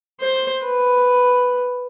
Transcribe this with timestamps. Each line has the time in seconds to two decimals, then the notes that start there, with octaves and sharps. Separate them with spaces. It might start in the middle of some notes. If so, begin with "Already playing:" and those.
0.21 C5
0.65 B4